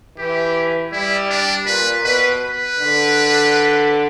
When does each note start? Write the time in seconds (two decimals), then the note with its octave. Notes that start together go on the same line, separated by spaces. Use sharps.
0.17 E3 G4
0.92 G3 E4
1.30 D4
1.66 A#2 B4
2.04 B2 B4
2.41 B4
2.78 D3